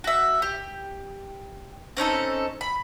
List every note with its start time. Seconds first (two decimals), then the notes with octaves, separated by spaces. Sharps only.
0.04 F#4 E5
0.42 G4
1.97 C4 C#4 D#4 A4
2.61 B5